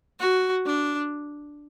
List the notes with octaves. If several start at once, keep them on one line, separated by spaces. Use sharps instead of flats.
F#4
D4